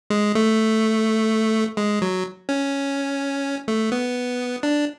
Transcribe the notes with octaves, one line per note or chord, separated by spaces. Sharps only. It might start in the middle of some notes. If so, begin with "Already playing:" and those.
G#3
A3
G#3
F#3
C#4
A3
B3
D4